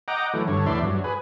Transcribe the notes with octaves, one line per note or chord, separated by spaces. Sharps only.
D#5 F#5 G5 A#5 D6
E3 F#3 A3
G2 D3 C#5
E2 A2 D5 E5 C6
G2 F#3
G#4 B4